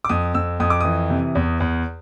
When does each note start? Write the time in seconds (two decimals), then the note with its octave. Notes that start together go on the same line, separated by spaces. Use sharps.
0.05 D6
0.09 F2 D#6
0.35 F2 E6
0.60 F2 D#6
0.70 D6
0.81 E3 D#6
1.10 C3
1.35 E2
1.60 E2